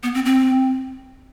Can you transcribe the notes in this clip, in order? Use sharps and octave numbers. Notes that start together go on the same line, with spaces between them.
B3
C4
C4